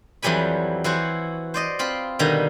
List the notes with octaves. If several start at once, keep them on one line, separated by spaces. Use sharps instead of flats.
F2 E3 F#3 G3 G#5 B5
E3 E4 F#4 C5 C#5
C5 D5 D#5
C4 F4 B5
B2 D3 D#3 G3 A#5